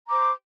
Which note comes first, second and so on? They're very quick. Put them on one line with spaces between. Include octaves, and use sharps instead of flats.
A#5 D6 C5